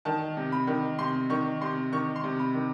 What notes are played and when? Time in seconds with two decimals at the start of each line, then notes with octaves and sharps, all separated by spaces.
0.05 D#3 A5
0.37 C3
0.52 B5
0.67 D#3
0.98 C3 C6
1.30 D#3 C#6
1.61 C3 C6
1.92 D#3 C#6
2.16 C6
2.23 C3
2.39 B5
2.54 D#3